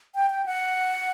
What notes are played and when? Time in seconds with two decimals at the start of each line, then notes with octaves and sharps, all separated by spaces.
0.15 G5
0.31 G5
0.46 F#5